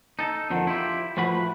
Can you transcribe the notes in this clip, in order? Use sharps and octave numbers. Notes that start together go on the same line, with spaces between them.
D#4 A4
F2 D3 D#3
E4 F4 G4
A2 F3 F#4 B4 B5